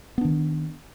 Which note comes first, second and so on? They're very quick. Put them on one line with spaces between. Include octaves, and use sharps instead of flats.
B3 D4 D#3